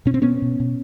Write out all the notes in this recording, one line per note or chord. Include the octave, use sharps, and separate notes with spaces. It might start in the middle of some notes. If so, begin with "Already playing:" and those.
B2 C#4
C4
B2 B3 C#4
B2
B2